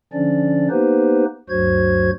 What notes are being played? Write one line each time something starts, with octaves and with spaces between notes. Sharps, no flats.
D3 F3 C#4 D4 D5
A#3 B3 D#4 G4 B4 C5
D2 G2 F#3 F#4 C5 G#6